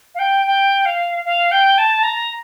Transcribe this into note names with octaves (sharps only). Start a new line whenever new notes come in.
F5
G5
G5
F5
F5
G5
A5
A#5